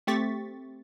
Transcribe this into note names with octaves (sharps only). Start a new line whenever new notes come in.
A3 C4 G4 C#6 A6 B6